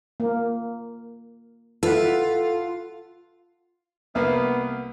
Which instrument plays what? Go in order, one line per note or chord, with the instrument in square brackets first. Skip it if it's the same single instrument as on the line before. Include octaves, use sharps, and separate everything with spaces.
[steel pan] A#3
[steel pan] E4 B4 E5 [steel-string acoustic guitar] F4 [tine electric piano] A4 F#5
[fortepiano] C2 A#3 [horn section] B3